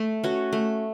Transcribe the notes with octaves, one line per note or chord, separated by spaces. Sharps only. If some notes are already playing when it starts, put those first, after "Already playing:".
Already playing: A3
C#4 F#4
A3